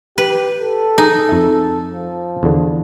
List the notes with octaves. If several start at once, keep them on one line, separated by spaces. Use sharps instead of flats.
G4 B4
A4
D#4 G#4
F2 E5
F3
E2 D3